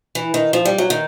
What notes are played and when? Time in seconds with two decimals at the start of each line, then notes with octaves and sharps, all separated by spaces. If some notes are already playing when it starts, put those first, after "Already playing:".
0.15 E3
0.34 D#3
0.53 F3
0.65 G3
0.78 F#3
0.90 D#3